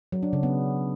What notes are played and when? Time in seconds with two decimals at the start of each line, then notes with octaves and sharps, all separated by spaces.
0.12 F#3
0.23 D4
0.33 C#3
0.43 B3